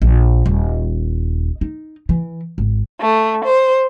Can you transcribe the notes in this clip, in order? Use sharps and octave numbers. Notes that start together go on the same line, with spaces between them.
A#1
D#1
D#4
E3
G#1
A3
C5